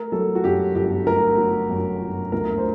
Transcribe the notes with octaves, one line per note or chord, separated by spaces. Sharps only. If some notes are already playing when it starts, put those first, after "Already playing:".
Already playing: A3 A#4
F#3 A4
F#4
F#2 G4
G1 G4
A3 A#4
F#3
F#2
G1
D2 A#4
C5